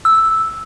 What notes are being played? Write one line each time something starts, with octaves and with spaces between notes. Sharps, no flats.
E6